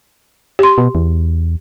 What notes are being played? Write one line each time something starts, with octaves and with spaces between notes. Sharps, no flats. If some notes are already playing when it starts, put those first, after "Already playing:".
G4 C6
B2
E2